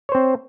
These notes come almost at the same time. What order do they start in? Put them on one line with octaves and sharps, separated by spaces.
C#5 C5 C4